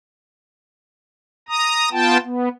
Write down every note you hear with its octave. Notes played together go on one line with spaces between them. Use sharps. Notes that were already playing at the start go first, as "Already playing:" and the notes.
A#5 D#6
B3 F4 G5 A5
B3